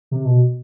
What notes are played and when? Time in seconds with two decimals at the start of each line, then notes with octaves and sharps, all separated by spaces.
0.11 C3
0.25 B2